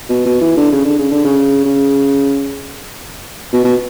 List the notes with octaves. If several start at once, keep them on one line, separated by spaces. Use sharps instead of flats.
B2
B2
E3
D3
C#3
D3
C#3
D3
C#3
C#3
B2
B2